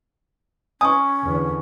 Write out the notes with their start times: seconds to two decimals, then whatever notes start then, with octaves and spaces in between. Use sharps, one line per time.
0.81 C#4 G#5 C#6 D#6
1.21 E2 D3